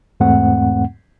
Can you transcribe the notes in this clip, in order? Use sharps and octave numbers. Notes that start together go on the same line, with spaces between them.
E2 G#2 A3 C4 F#5